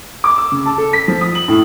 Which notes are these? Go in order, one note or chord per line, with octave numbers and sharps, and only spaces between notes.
D6
E6
C#3
A5
A4
B6
F3
D#6
F#7
A2